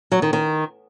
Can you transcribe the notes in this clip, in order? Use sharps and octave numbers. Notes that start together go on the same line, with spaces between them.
F#3
D#3
D#3